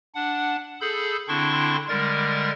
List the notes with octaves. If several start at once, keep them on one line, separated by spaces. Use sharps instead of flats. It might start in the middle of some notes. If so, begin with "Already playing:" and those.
D4 F#5
G#4 A4 B5 G6
D3 C4 D4 E4 C6 C#6
D3 G3 G#3 A#4 A6